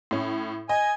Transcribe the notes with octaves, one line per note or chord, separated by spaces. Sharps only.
A2 C#4
D#5 G#5